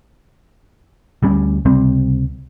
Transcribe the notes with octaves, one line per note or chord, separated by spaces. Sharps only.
D2 G3 C#4
C#2 C3 G3 C4